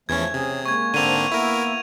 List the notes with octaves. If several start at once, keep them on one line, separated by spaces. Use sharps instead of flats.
E2 E3 F3 A3 C#4 G#6
C3 C#4 G#4
G#3 A#3 C#6 G#6
G#2 D3 A#3 C4 A5 D#7 F7
A#3 B3 E4 A#4 E5